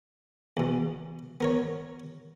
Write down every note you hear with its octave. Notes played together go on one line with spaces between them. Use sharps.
E2 B2
B3 A#4 C#5